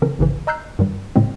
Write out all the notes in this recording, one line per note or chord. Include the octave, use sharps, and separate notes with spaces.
C#3 E3 C4 A4 A#4
A1 G#2 C#3 E3
D#5 A#5 E6 F#6 G6 C7
G2 D#3 G3
A2 C#3 G#3 C4